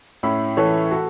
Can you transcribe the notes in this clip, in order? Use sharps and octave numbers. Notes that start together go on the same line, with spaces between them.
A2 C#4 E4
E3 A4 C#5
F#4 A4